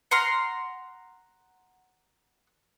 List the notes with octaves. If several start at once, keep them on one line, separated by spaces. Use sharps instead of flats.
F#5 A#5 C6 F6